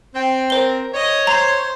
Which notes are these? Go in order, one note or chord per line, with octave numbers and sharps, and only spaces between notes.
C4 G5
A#4 C5 G7
C#5 D#5
C5 A#5